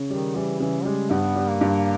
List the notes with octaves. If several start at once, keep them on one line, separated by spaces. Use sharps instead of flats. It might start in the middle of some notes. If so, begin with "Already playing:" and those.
Already playing: C#3
D#3 G3
E3 G3
C#3 E3
G3 G#3
G2 B3
G3
A#3
G2